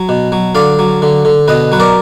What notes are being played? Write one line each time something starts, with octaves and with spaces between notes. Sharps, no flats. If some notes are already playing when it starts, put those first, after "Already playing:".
Already playing: F#3
B2
F#3
D3 D5 F5
F#3
D3
D3
B2 B4 D#5
F#3 B4
A#4 D5